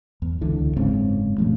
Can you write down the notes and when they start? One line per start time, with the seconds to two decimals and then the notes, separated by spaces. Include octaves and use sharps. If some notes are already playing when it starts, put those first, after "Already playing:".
0.22 E2
0.41 C#2 D3 E3
0.77 F#1 G#2 C#3 C4
1.38 G2 A#2 F3 A3